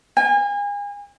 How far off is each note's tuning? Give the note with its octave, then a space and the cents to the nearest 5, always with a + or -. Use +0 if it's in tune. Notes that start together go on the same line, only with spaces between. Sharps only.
G#5 -35